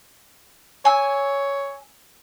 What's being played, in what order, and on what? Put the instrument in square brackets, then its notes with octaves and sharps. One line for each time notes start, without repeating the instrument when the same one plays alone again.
[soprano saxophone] C#5 [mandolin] G#5 E6